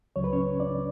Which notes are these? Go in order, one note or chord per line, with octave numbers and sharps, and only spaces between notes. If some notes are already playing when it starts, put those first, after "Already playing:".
C#2 C#3 F#3 C#5
B4
C#4 C#5
D4 D5